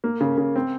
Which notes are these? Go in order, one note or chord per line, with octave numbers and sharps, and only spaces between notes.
A#3
C#3
C#3
C4